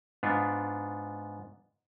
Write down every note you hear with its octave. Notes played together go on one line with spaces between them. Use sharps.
G#2 B3 D4 F4